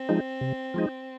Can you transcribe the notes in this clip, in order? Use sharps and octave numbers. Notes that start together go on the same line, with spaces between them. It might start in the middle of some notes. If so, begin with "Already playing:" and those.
Already playing: C4
F3 G#3 D#4
C3
F3 G#3 D#4